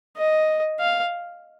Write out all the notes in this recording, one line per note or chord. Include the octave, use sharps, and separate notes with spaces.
D#5
F5